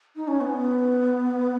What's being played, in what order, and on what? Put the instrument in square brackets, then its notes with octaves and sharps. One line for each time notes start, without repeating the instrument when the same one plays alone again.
[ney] D#4
C#4
B3